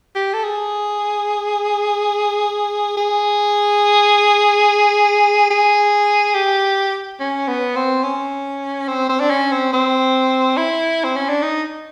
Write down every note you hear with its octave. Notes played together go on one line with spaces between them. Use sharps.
G4
A4
G#4
G#4
G#4
G4
C#4
B3
C4
C#4
C4
C4
D4
C#4
C4
C4
E4
C4
C#4
D4
D#4